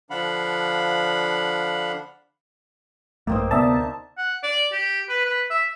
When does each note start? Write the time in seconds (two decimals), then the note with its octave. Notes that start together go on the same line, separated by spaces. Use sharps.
0.10 D3 F3 D4 F5 F#5 B5
3.27 A#1 G2 A3 A#3 C4 D#4
3.51 D2 C3 B3 D4 D#4 E5 A5
4.18 F#5
4.43 D5
4.72 G4
5.09 B4
5.25 B4
5.50 E5